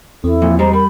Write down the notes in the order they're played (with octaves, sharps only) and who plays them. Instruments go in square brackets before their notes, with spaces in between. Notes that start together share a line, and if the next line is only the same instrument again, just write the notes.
[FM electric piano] E2 C4 [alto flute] E4 [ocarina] A4
[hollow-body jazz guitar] F2 A#2
[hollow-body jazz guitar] G3 G#3 [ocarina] C5 [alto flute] A#5
[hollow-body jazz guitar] G3 [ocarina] A#4 [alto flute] B5